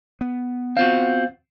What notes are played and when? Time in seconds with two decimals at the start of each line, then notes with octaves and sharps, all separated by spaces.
0.21 B3
0.77 C4 F4 F#4 F5